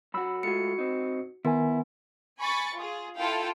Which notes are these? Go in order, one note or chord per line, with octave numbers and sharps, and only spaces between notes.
F#2 F#4 B5 E6
G#3 A3 F4 F#4 C#7
C4 D#4
D#3 B3 E4 A#4 G#5
G#5 B5 C#6 A6
F4 G#4
E4 F4 A4 F5 G5